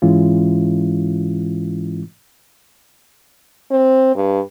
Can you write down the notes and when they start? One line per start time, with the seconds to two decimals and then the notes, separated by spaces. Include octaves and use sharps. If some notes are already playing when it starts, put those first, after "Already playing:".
0.02 G#2 E3 G#3 C#4 E4 F4
3.70 C4
4.15 G2